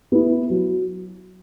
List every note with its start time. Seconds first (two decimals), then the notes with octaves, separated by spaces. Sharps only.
0.12 B3 E4
0.50 F#3